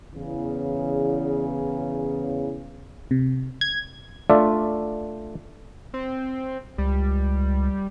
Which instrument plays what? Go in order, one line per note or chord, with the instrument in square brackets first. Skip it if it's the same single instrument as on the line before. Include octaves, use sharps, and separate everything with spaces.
[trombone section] E2 C#3
[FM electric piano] C3
G#6
[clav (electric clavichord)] A3 D4 F4 D5 E5
[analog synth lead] C4
[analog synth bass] C#2 [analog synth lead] G3